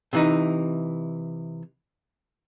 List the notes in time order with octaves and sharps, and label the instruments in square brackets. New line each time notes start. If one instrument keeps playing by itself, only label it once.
[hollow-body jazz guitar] C3 E3 D#4